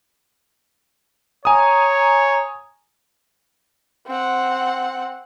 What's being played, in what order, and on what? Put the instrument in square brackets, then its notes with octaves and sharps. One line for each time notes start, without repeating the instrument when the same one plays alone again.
[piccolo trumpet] C#5 [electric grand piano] G#5 D#6 [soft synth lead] A#5
[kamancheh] C4 F#5